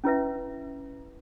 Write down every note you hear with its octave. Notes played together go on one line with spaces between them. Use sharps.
C#4 E4 B4 E5